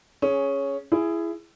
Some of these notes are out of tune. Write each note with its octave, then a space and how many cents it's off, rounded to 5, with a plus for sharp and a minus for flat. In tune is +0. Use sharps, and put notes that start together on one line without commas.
C#4 +0 G#4 +10
E4 +20 G#4 +0